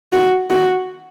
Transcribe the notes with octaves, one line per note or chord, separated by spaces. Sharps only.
F#4
F#4